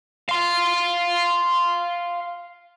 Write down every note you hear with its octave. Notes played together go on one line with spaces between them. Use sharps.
F5 C6